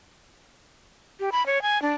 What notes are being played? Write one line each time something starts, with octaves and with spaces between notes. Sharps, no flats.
G4
B5
C#5
G#5
D4